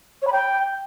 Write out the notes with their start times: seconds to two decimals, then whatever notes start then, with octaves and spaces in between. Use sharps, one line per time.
0.22 C#5
0.27 B5
0.32 G5